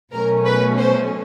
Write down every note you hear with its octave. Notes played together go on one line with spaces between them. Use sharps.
B2 F#3 A3 C#4 A#4
B4
C5